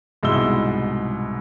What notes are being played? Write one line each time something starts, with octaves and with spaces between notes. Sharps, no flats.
C2 G#2 B2 E4 E6 G7